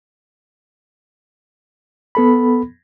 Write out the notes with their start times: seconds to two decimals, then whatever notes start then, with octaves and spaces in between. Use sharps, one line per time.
2.15 B3 A4 B5